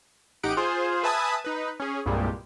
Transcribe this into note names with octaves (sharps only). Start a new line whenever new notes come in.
A1 D#4 G4 F#5 D7
F4 G#4 C5
B4 E5 G#5 A5 D#6
D#4 B4
C#4 G#4
C2 G2 A#2 G3 G#3